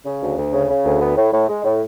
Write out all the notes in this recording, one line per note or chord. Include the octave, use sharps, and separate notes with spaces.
C#3
D2
D2
C#3
C#3
D2
B3
A2
A2
G#3
A2